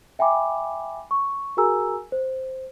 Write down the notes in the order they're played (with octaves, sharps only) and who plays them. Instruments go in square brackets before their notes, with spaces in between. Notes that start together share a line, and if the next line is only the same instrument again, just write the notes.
[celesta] E5 G5 G#5 B5 D6
C#6
F#4 G#4 A#4 G#5 A#5 E6
C5